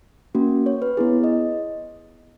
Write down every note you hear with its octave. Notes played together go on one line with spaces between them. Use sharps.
A#3 C#4 F#4
C#5
B4
B3 E4 G#4
D#5